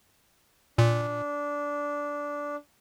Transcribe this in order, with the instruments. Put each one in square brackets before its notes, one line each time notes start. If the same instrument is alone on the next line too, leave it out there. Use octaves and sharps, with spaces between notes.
[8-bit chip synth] A#2 [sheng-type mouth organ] D4